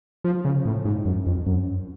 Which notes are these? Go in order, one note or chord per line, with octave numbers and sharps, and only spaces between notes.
F3
C#3
A2
G#2
F#2
F2
F#2